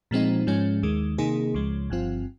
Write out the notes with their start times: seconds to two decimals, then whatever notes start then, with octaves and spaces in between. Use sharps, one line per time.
0.11 A#2 F3 G#3 C4 D#4
0.47 G#2 F3 G#3 C#4
0.83 D#2 D#3 G#3
1.18 C3 D#3 A#3 D#4 G#4
1.54 C#2 C#3 F3 G#3
1.90 G1 G2 F3 C4 F4